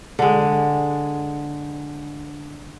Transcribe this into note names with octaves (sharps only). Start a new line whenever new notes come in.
D3 G#3